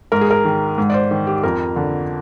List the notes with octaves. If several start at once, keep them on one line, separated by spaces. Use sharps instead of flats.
G#2 A#4
G#4
A#4
D#3
G#2
D5
C5
D#3
G4
F2 A#4
D3